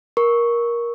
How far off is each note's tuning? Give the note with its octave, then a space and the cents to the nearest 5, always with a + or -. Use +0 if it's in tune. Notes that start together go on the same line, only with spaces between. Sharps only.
A#4 +15 C#6 +0